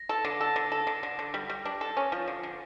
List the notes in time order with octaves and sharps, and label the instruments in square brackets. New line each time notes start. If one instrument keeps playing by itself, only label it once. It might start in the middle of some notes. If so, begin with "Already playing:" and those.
Already playing: [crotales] A#6
[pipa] A4
D3
A4
D3
A4
D3
D3
D3
G3
G3
D4
A4
C#4
F3
D3
D3